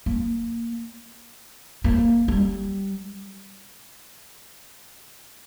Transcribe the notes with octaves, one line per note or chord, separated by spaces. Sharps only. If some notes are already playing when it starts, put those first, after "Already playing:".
A#3
A#3
G3